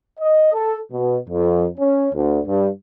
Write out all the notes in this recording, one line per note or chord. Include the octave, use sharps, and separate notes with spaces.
D#5
A4
B2
F2
C#4
D2
G2